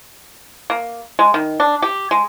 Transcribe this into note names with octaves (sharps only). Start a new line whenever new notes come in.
A#3
G#3
D#3
D4
G4
G#3